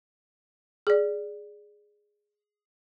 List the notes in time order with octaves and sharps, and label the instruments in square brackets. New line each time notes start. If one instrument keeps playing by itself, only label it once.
[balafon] G#4 D5